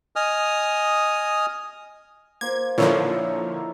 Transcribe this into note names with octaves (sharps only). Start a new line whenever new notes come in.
D#5 G#5 D#6 F6
A#3 C5 G#6
A#2 D3 F3 D#4 E4 A#4 C#5